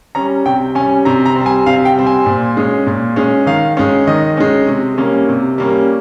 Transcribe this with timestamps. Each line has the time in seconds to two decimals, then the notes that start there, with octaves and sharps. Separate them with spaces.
0.15 G3 C#4 A#5
0.45 C3 G5
0.75 C#4 G#5
0.80 G3
1.05 C3 A#5
1.26 A#5
1.36 G3 C4
1.46 G#5
1.66 C3 F5
1.85 G5
1.96 G3 C4
2.06 G#5
2.26 A#2
2.57 G#3 C#4
2.87 A#2
3.16 G#3 C#4
3.46 D#3 F5
3.77 G#3 C#4
4.07 D#3 D#5
4.37 G#3 C#4
4.68 C3
4.98 G3 A#3 C#4
5.28 C3
5.58 G3 A#3 C#4